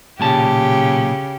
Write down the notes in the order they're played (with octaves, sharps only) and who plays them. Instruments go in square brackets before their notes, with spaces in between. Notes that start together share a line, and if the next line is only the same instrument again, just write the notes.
[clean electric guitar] B1 A#2 A5 [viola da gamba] C#3 G4